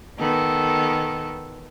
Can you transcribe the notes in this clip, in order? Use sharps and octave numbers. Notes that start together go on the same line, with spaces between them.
D#3 B3 A4